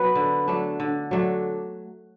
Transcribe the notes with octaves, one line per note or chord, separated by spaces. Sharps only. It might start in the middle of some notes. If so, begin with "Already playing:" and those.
Already playing: F#3 B3 B4
D3
F#3 A3 D4
D3
F#3 A3 D4